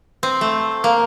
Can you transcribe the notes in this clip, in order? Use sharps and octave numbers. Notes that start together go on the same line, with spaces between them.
C4
A3
A#3